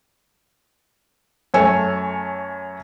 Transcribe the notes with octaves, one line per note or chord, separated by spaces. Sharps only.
F#2 A3 C#5 G#5 E6